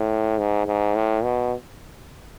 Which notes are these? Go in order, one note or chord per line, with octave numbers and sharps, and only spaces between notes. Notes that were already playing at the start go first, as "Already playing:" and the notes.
Already playing: A2
G#2
G#2
A2
B2